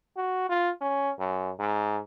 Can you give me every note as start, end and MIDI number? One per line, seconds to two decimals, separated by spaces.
0.17 0.49 66
0.49 0.70 65
0.81 1.11 61
1.19 1.51 42
1.60 1.99 44